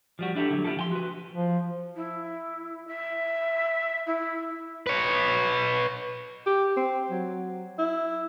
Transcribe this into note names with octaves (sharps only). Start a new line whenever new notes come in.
F3 G3 F#4
D4 E4 G4 A4
D3 F#3
B3 E4 F4 G4 A4
F3 G5 C6
F#4 B4
F3
E4
E5
E4
B4 C#5
G4
C4
F#3
E4